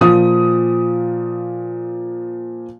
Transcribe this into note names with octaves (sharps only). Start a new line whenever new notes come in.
A#2 F3 D#6